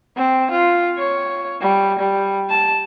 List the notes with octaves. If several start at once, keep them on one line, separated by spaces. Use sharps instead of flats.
C4
F4
C#5
G3
G3
A5